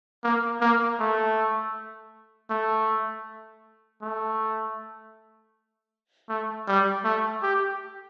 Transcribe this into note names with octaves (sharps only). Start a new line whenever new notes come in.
A#3
A#3
A3
A3
A3
A3
G3
A3
G4